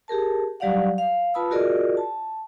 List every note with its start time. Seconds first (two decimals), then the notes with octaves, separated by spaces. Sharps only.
0.08 G4 G#4 A#4 A5
0.60 F#3 G3 G4 D5 F5 F#5
0.98 F5
1.34 F4 B4 A5 B5 D#6 E6
1.51 F4 F#4 G#4 A#4 D5 D#5
1.97 A5